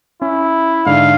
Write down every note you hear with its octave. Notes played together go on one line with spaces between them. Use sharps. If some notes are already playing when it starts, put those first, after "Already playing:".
C#4 E4
G#2 D3 D4 F5